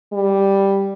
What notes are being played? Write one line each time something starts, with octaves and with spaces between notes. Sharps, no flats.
G3